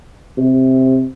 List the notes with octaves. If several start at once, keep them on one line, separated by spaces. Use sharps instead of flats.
C3